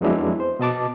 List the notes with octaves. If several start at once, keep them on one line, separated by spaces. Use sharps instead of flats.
F2 F#3 G#3 B3 D4 E4
C5
B2 D#5 A5 D6